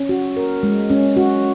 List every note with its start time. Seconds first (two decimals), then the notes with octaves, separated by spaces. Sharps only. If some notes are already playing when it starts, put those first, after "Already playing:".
Already playing: C#4
0.09 F#4
0.37 A#4
0.63 G#3
0.90 C#4
1.17 F#4